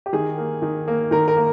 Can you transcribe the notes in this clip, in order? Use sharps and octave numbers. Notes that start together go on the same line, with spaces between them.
G4
D#3 G#4
A#3
D#3
A#3
D#3 A#4
A#4
A#3